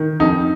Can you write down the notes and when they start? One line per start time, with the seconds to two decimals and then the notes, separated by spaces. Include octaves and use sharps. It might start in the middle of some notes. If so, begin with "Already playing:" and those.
Already playing: D#3
0.20 F2 D#4